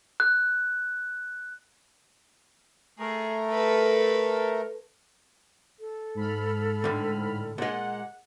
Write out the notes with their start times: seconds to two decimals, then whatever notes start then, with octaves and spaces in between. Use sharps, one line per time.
0.20 F#6
2.99 A3 G#4 A#4
3.51 A4 B4
5.80 A4
6.15 G#2 B5 F6
6.84 A2 D3
7.58 A#2 G#3 F#5